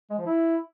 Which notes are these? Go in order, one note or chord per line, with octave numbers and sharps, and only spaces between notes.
G#3
F3
E4